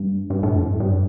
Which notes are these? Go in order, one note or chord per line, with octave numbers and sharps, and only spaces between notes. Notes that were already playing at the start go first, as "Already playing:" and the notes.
Already playing: G2
G2
A2
F2
G2
G2